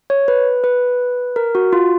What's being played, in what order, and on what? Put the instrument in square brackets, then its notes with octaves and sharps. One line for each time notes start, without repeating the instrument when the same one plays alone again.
[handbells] C#5
B4
B4
A#4
F#4
F4